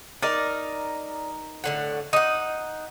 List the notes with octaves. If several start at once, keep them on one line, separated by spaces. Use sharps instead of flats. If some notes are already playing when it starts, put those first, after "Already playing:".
D#4 A#4 D5
A2 D3 F#5
D#4 F#5 D#6